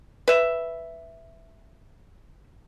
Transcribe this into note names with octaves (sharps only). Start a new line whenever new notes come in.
B4 E5